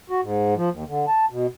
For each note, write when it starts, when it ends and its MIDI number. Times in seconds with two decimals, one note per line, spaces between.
0.10 0.21 66
0.22 0.54 44
0.56 0.69 53
0.71 0.84 39
0.88 1.05 50
1.08 1.25 81
1.30 1.47 47